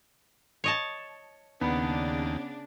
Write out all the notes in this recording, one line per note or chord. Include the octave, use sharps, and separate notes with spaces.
C#5 D#5 A5
D#2 C#3 B3 D4